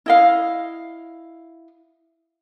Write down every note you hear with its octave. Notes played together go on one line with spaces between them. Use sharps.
E4 D#5 F5